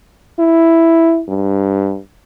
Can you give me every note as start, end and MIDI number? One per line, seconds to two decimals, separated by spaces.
0.39 1.23 64
1.29 1.99 43